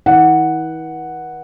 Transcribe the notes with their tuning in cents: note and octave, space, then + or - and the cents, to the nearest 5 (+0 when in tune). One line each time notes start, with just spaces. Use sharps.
E3 -40 F#5 +0